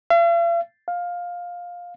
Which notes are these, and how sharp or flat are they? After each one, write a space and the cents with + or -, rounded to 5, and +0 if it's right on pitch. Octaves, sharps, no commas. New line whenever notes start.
F5 -45
F5 +15